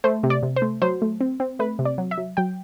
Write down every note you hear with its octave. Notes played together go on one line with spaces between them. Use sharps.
A3 C5
C3
D5
C3
C5
A3
F#3 C5
A3
C4
C4
A3 B4
C3
D5
F#3
E5
F#3
F#3 G5